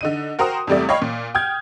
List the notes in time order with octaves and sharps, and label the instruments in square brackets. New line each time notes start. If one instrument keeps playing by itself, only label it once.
[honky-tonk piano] D3 D#4 D#7
F#4 A#4 C5 G5 A#5 D#6
E2 C3 G3 A3 D5
C#5 D#5 F5 G5 B5 C#6
A#2
G5 D#6 F6 G6 G#6